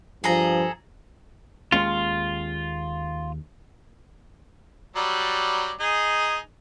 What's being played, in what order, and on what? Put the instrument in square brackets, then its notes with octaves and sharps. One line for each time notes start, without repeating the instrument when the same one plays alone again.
[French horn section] G2 F3 [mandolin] G#4 A4 A#5
[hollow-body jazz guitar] D#2 G#3 C#4 [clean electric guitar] F4
[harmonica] F#3 G3 D5
D#4 G#4